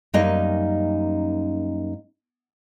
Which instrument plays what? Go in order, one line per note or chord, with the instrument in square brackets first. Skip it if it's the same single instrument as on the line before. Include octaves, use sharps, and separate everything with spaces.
[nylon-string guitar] F#2 G3 A#3 C#4 D#4 D#5